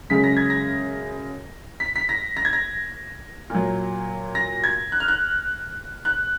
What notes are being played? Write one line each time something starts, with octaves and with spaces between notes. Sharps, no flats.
F#2 C#3 G#3 B6
A#6
G#6
A#6
B6
B6
A#6
A#6
G#6
A#6
A#2 F#3
A#6
G#6
F#6
F6
F#6
F#6